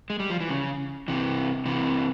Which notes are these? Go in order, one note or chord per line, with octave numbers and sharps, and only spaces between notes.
G#3
G3
F3
E3
C#3
C3 E3
C3 E3